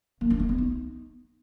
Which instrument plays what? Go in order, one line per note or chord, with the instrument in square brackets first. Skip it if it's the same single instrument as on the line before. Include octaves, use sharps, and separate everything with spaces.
[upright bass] A#3
D4
A3
B3
D#4